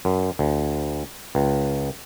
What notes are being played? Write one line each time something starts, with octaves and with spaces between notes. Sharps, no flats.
F#2
D2
C#2